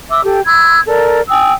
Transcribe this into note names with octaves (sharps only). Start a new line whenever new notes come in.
E5 D6 E6
G4 A4 G5
B5 C6 E6 G#6
A4 A#4 D5
G5 G#5 D#6 E6